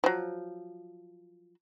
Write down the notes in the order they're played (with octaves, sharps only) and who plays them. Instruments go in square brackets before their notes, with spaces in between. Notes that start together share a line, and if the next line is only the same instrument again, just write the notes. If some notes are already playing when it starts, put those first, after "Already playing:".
[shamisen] F3 F#3